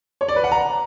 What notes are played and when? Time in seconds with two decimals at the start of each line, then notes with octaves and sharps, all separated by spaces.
0.21 C#5
0.28 D5
0.36 B4
0.44 F#5
0.51 A#5